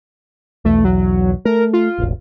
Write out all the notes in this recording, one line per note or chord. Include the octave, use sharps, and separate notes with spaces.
B1 E2 A3
F#3
A3 A#4
F4
E1 A1